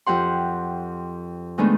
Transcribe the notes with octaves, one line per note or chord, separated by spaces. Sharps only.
F2 G4 F#5 C6
D#3 G#3 A3 B3 D4 D#4